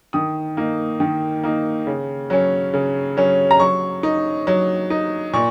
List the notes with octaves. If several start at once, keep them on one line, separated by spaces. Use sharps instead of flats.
D#3 D#6
A#3 D#4
D#3
A#3 D#4
C#3
F#3 C#4
C#3
F#3 C#4
A#5
F#3 C#6
D#4
F#3
D#4
A#2 C#6